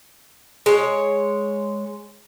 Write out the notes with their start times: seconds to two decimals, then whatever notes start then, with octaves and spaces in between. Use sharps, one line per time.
0.66 G#3 C#5